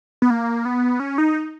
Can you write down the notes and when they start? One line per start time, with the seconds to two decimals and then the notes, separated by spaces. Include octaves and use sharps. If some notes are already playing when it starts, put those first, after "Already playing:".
0.22 B3
0.30 A#3
0.65 B3
1.00 C#4
1.18 D#4